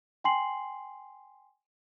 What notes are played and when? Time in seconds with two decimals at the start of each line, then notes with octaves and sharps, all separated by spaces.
0.24 G5 G#5 C6 C7 F#7